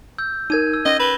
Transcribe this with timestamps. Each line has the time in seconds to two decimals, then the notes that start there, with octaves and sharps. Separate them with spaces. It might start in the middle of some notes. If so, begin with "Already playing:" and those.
0.18 E6 G6
0.50 D#4 A#4 G#6 D#7
0.74 E6
0.86 C#4 D#5 A#6
1.00 B4 E7 G7